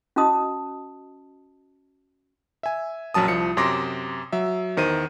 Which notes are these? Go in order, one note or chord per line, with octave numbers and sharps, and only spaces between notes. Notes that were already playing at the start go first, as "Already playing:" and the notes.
C#4 F#4 D#5 A5 D#6
E5 G#5
A#1 F#2 F#3 A5 D#6
C2 F3 C#7
F#2 C3 C6 D6 A#6
F#3 E5
E2 D#3 C5 D#7